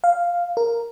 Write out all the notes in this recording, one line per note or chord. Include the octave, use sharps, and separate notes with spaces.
F5
A#4